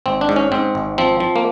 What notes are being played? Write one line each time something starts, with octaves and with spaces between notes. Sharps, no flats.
G#1 C4
D4
G#2
C#4
G#2 C4
G#1
F3 C4
F3
A#3